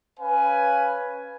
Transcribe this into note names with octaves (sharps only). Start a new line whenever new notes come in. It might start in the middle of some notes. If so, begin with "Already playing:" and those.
C#4 B4 F5 G#5